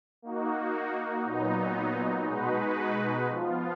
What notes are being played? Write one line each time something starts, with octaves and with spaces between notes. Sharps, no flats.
A#3 D#4 F#4
A#2 F#3 B3 D#4
B2 G#3 D#4 F#4 B4
F3 B3 F4